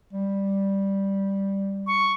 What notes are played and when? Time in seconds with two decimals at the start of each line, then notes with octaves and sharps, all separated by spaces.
0.13 G3
1.87 C#6